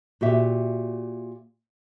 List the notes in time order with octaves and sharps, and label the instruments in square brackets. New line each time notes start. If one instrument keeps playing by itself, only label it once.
[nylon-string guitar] A#2 F#4 G4 E5